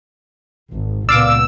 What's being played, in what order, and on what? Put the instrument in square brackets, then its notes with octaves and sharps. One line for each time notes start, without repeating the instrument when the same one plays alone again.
[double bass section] G#1
[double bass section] C#2 A#2 B3 [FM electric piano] D5 F5 D6 [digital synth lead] E6